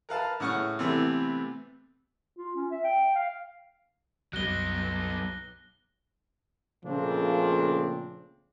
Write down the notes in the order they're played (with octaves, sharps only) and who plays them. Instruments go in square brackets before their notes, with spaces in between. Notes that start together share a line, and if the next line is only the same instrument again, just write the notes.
[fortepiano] A#4 B4 F5 A5
A2 C#3 F#5 C#6 F6
C3 E3 A3 B3 C4
[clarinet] F4
C#4
E5
G5
F5
[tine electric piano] C2 F#2 [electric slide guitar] F#3 B3 [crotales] F#6 A#6 G7
[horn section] A#2 C#3 F3 A3 C4 D4